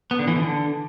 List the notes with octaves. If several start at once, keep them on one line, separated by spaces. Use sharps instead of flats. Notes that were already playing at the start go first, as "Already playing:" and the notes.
B3
D3
E3
D3